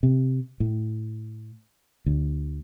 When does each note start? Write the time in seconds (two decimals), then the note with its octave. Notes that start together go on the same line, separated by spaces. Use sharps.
0.03 C3
0.60 A2
2.06 D2